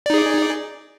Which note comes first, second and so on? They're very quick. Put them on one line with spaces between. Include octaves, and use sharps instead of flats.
D5 D#4 G#4